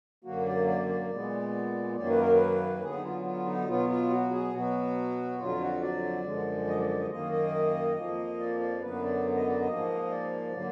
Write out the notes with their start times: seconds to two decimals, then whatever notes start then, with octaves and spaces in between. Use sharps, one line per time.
0.24 F#2 D3 F#3 A#3 F#4
0.46 D5
0.67 D5
0.89 D5
1.10 A#2 G#3 B3
1.96 F#2 D#3 F#3 A#3 D5
2.09 B4
2.21 A#4
2.34 B4
2.82 D3 F#3 B3 G#4
2.95 D#4
3.04 F4
3.24 F4
3.46 D#4
3.67 B2 F#3 B3 F4
3.89 F4
4.10 F#4
4.32 G#4
4.53 B2 F#3 B3 F#4
5.39 F2 D3 F#3 F4
5.60 F#4
5.82 D5
6.25 F#2 D3 F3 G#3
6.67 D#5
6.79 D5
6.89 D5
7.00 D#5
7.10 F#2 D#3 A#3 D#5
7.32 D#5
7.96 F2 F3 A#3
8.39 D5
8.60 D5
8.82 F#2 D3 F#3 B3 B4
9.03 D5
9.36 D#5
9.48 D5
9.60 D#5
9.68 G#2 F3 A#3
10.11 D5
10.53 D3 F#3 A#3